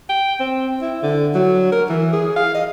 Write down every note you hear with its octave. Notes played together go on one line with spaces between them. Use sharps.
G5
C4
E4
D3
F#3
A#4
E3
G#4
F5
D#5